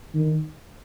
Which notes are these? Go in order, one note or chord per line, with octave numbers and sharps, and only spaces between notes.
D#3